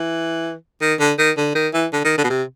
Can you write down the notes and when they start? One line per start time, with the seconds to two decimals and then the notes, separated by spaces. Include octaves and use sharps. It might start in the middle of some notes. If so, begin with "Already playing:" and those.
Already playing: E3
0.81 D#3
1.00 D3
1.18 D#3
1.37 D3
1.55 D#3
1.74 E3
1.93 D3
2.05 D#3
2.18 D3
2.24 B2
2.30 C3